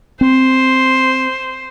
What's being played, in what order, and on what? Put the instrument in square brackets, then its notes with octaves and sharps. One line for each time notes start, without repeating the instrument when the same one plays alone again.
[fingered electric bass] C4 [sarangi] C5